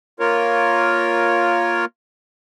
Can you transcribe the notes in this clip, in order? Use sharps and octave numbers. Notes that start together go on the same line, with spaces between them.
A#3 F4 A#4 C#5